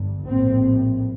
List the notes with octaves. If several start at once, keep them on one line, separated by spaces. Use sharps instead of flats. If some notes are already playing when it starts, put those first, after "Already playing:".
Already playing: G1 G2
A#1 A2 C4